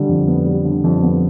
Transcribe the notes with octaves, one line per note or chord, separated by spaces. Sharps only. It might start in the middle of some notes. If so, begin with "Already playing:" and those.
Already playing: D3 G3
F2
B3
G3
D3
F2
B3